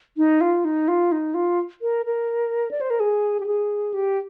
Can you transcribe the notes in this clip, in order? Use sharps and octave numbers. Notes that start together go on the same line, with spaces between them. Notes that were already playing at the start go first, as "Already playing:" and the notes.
D#4
F4
D#4
F4
D#4
F4
A#4
A#4
D5
C5
A#4
G#4
G4
G#4
G4